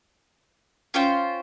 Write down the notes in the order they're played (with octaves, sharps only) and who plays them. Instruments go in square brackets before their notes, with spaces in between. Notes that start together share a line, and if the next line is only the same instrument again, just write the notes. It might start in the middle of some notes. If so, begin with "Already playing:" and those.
[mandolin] C#4 F4 C5 G5